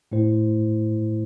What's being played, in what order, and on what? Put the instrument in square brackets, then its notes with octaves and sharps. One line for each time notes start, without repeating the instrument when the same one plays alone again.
[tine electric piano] A2 A3 E4 C5